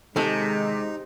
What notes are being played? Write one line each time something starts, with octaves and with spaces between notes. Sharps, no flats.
C3 D#3 G#3 D#4 G#4 A4